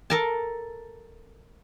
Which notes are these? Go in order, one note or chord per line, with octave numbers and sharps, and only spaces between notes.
A4 A#4 A5